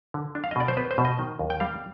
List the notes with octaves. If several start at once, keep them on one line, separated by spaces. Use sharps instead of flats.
D3
D4
F5
D#5
B2 D5
C5
B3 B4
C5
B2
D#5
D#3
D#2
G5
G3 F5